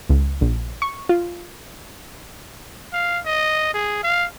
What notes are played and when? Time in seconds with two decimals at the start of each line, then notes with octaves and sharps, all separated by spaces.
0.09 C#2
0.41 A#1
0.82 C#6
1.09 F4
2.93 F5
3.26 D#5
3.74 G#4
4.03 F5